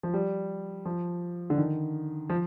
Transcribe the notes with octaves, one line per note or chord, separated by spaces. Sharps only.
F3
G3
F3
D3
D#3
F3